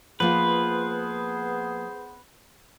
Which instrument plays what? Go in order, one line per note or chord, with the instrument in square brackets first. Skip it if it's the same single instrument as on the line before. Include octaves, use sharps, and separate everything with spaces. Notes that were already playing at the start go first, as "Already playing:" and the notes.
[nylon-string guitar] F3 A#3 F4 [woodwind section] B3 G#4 C5 [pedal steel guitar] B4